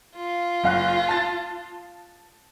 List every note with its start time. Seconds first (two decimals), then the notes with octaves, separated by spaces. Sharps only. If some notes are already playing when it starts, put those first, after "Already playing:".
0.15 F4
0.63 F#1 F5 F#6
1.08 A5 A6